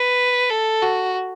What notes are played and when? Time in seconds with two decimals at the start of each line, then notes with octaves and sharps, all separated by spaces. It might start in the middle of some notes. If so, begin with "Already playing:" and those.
Already playing: B4
0.50 A4
0.82 F#4